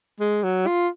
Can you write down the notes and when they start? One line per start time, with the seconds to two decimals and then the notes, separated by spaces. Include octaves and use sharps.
0.20 G#3
0.43 F#3
0.67 F4